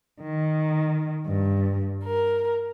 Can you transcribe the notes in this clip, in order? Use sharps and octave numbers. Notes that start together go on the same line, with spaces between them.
D#3
G2
A#4